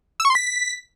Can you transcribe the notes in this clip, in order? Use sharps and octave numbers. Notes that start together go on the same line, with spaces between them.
E6
C#6
C6
B6